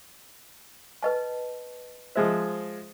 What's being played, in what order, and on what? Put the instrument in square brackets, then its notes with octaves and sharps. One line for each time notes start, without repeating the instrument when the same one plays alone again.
[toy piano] B4 D#5 A5
[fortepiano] F3 G#3 E5 [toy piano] C5